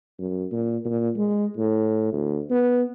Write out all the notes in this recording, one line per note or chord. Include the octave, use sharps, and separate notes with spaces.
F#2
A#2
A#2
G#3
A2
D2
B3